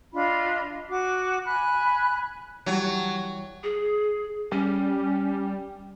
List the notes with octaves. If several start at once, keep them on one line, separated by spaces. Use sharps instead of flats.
D4 F4 D#5 B5
F#4 D6
G#5 B5 F#6
E3 F#3 G3 A5
G#4
G3 C#4